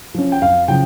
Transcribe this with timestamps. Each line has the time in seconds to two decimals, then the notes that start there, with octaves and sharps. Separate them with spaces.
0.15 F3 C#4
0.32 G5
0.42 F2 F5
0.68 C#3 F3 G5